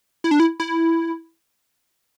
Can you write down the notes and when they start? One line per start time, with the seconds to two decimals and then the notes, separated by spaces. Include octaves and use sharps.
0.24 E4
0.31 D4
0.40 E4
0.60 E4